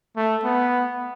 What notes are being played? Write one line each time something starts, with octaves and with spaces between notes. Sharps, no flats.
A3
B3